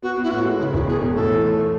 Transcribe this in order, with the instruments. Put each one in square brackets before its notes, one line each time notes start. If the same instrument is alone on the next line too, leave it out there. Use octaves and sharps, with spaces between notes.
[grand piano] B3 [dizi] F#4
[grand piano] B3
[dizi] E4
[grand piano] A2 [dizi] F#4
[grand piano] G#3
[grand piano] C#3 [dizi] E4
[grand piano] E1 [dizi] E4
[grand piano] B2 [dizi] G#4
[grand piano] B2
[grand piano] A2 [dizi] A4
[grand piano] E3
A3